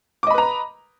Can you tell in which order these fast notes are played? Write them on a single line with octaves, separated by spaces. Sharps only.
D6 D#5 B5 B4 A#5